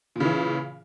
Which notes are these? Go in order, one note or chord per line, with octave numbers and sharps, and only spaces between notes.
A#2 C#3 E3